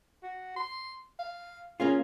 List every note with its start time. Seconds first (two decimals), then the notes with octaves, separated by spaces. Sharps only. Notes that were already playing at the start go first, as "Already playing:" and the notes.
0.23 F#4
0.56 C6
1.19 F5
1.80 A#3 C#4 F4 G#4